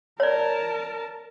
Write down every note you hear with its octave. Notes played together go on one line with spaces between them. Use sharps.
A#4 C#5 D5 A5